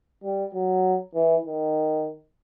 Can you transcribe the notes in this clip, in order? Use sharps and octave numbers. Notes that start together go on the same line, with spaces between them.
G3
F#3
E3
D#3